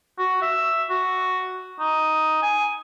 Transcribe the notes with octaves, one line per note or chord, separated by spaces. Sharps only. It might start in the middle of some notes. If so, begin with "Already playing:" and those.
F#4
E5
F#4
D#4
G#5